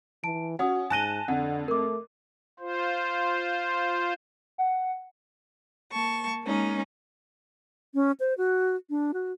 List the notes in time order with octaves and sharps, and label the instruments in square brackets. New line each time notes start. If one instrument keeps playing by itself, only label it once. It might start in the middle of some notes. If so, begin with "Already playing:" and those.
[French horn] E3 [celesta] A5 D7
[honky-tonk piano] C#4 [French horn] F#4 [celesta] F#5 D#6
[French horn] G#2 [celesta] G#5 A#6 G7 [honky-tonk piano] A5 F#6 D#7
[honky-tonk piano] F2 [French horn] D3 [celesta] F#5
[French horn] A3 [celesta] A#4 D6
[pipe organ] F4 C5
[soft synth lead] F#5
[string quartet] A#3 A5 C#6
G#3 A#3 C#4 D#4
[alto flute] C#4
C5
F#4
D4
F#4